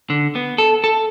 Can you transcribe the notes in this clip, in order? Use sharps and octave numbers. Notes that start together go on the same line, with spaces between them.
D3
B3
A4
A4